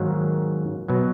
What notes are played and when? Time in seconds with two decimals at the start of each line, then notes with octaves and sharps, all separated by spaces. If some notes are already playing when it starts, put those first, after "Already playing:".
Already playing: G#2 D#3 F#3 A#3
0.88 B2 F#3